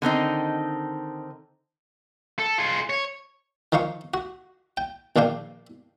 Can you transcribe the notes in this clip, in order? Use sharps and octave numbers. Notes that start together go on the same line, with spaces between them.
D3 D#3 C4 D#4
A4
F4 G#4
C#5
D#3 F3 D#4 F5 C#6
F#4
G5
A#1 D#3 D4 F5 G5